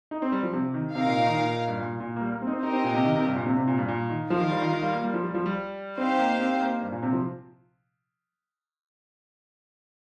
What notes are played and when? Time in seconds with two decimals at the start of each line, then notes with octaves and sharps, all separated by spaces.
0.11 D#4
0.22 C4
0.32 G3
0.43 F3
0.53 C3
0.74 D#3
0.95 C3 D#4 A#4 F5
1.06 A#2
1.16 A#2
1.27 D#3
1.37 A#2
1.68 G2
1.79 A#2
2.00 A#2
2.16 A#3
2.21 G3
2.31 A#3
2.42 C4
2.47 D#4
2.52 C4
2.62 D#4 G4 A#4 D#5
2.73 C4
2.84 A#2
2.94 C3
3.05 D#3
3.15 C3
3.25 G2
3.36 A#2
3.46 C3
3.57 C3
3.67 A#2
3.78 G2
3.88 A#2
4.10 D#3
4.30 F3 F4 A#4 F5
4.41 D#3
4.51 G3
4.61 D#3
4.72 D#3
4.83 G3
4.93 A#3
5.04 G3
5.14 F3
5.24 G3
5.34 F3
5.46 G3
5.97 C4 D#4 G4 C5 F5
6.19 A#3
6.39 C4
6.60 A#3
6.81 G2
6.92 A#2
7.03 C3
7.13 F3